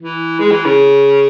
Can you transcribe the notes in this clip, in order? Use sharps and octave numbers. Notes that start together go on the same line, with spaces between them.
E3
G#3
E3
C#3